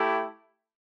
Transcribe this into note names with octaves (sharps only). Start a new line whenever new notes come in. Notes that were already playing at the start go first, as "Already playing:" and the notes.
Already playing: A3 E4 G4